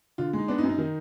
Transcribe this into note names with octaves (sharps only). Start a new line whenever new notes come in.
D3 F4
G#3
D#4
B3 D4
D#4
F#2
D#4
D#3